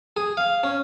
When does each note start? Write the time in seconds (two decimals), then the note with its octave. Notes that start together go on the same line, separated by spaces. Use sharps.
0.17 G#4
0.37 F5
0.63 C#4